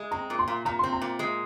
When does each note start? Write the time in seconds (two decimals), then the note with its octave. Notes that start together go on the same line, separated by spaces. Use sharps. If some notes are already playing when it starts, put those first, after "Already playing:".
Already playing: G#3
0.11 C4 A#5
0.30 A#2
0.39 C6
0.48 A#2
0.65 A#2 A#5
0.79 C6
0.84 C4
0.93 A#5
1.02 A#2
1.19 G#3